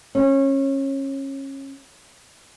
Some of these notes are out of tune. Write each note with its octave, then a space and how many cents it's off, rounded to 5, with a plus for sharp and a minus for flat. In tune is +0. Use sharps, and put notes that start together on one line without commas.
C#4 -25